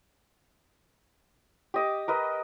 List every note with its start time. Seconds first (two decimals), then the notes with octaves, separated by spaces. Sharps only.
1.74 G4 D#5 D6
2.08 A#4 B4 D#5